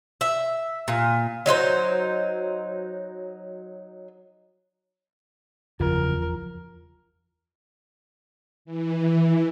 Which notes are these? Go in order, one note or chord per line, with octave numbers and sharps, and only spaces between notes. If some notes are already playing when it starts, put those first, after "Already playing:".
E5
A#2
F#3 D#4 E4 C5
F#1 E2 C#3 F3 A#4
E3